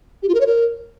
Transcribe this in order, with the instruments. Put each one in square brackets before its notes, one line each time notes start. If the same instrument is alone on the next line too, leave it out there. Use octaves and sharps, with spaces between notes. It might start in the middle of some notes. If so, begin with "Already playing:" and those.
[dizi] G4
F4
A#4
C#5
A#4